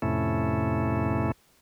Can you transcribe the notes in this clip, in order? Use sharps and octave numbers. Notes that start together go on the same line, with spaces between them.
F2 A2 C3 A3 C#4 E4